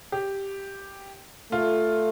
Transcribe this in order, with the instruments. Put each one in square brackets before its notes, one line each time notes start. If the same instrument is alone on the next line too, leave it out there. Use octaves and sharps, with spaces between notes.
[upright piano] G4
[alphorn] A3 [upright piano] F4